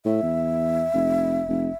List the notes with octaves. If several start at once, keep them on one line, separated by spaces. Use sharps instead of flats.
A2 E5
E2
F1
F1